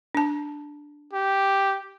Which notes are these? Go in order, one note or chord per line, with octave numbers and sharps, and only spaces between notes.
D4 A5
G4